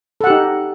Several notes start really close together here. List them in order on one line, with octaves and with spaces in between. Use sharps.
A4 F#5 G4 D#4